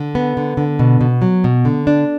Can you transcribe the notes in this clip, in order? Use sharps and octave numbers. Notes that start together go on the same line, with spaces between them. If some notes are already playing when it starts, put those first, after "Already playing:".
Already playing: D3
B3
D3
D3
B2
B2
F#3
B2
D3
D4